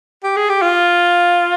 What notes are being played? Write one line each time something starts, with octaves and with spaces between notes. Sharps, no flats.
G4
G#4
G4
F4